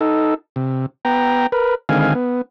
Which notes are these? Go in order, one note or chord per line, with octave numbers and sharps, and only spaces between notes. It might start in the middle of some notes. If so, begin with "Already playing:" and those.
D#4 A4
C3
B3 G5 A#5
A#4 B4
D3 D#3 G#3 C4 F5 G#5
B3